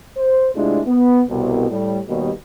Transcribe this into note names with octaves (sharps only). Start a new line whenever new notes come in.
C5
C3 G#3 A3 D4 E4 F4
B3
C2 B2
A2 G3
D#2 B2 G3